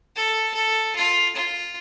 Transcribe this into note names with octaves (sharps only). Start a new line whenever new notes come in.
A4
A4
F4
F4